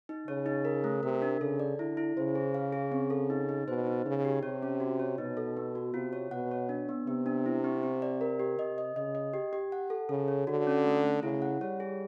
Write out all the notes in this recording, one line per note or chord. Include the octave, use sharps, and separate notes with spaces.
D#4
C#3 C#5
D#4
A#4
A3
C3 A#4
D4
C#3 A4
D5
D3 E4
E4
C#3 C5
G#4
F5
G#4
C4
A4
D#4
D#4
B2 C5
D#4
C#3 D#4
G4
C3 C#5
C#4
F#4
C#5
B2 D#4
A4
B3
F#4
C3 F4
C#5
B2 F#5
C#5
D4
B3
C3 B3
D4
E4
C4
C4
D5
A#4
G4
C3 D#5
D#5
C#3 D#5
D#5
G4
G4
F#5
A4
C#3 A4
C#5
D3 F#4
C#4
A3
A3
C#3 E4
F#5
G3 C#5
G#4